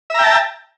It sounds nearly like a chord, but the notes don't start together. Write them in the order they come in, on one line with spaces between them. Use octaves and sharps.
E5 A#5 G5 A5